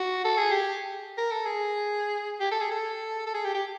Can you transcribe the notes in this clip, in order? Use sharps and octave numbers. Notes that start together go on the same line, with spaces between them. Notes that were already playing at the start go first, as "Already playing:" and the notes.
Already playing: F#4
A4
G#4
G4
A#4
A4
G#4
G4
A4
G#4
A4
A4
G#4
G4
G4